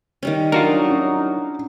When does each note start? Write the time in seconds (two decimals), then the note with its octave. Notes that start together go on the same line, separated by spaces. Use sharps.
0.23 D#3 G3 C#4
0.52 F#3 D4 D#4 F4 F#4 A#4
0.89 C#4 E4